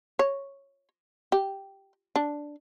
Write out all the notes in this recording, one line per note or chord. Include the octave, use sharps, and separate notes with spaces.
C#5
G4
D4